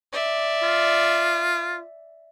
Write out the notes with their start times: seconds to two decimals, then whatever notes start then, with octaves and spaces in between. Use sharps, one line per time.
0.12 D5 E5
0.63 F4